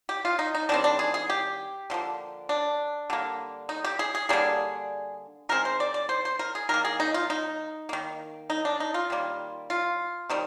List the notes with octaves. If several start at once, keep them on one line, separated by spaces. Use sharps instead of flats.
G4
F4
D#4
D#4
D#3 G3 C4 D4
D4
G#4
G#4
G4
D3 F3 A#3
D4
D3 G3 A#3
D#4
G4
G#4
G#4
D3 G3 A#3 G#4
D#3 G#3 C4 A#4
C5
D5
D5
C5
C5
A#4
G#4
D#3 A#3 A#4
G#4
D#4
F4
D#4
D#3 A#3
D#4
D4
D#4
F4
D#3 G3 A#3
F4
C3 D#3 G3